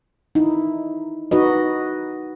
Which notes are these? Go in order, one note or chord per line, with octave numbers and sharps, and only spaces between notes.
D#4 E4
D#4 F#4 B4 D#5